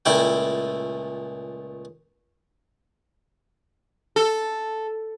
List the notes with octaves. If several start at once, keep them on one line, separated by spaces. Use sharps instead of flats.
C#2 A#2 A3 E4 G5
A4